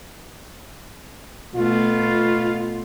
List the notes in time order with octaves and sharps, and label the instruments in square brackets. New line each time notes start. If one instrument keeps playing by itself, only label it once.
[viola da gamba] B2 A3 B3 [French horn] F4